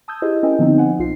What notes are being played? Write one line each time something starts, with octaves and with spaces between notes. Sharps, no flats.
A5 D#6 E6 G6 G#6
E4 G4 G#4 C5 D#5
C#4 E4 A#4 D#5 G5 G#5
D3 F3 B3 C4 D#4
C5 F#5 G#5
B1 F4 C7